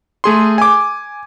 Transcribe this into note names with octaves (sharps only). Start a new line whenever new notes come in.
A3 G#4 C6
G#5 D6